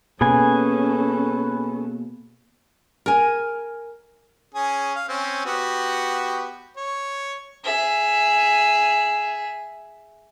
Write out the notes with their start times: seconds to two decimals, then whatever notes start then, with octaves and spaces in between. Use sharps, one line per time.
0.21 B2 A#3 C#4 G#4 A4 B4 G#5
3.06 A#4 G#5
4.54 C#4 G#4
4.95 F5
5.08 C4 C#4
5.45 B3 F#4 G4
6.77 C#5
7.64 G#4 E5